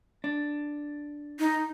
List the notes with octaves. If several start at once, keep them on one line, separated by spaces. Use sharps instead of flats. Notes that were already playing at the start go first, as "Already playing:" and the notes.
D4
D#4